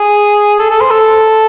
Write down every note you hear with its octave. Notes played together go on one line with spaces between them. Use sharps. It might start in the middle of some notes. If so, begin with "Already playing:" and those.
Already playing: G#4
A4
A4
C5
A4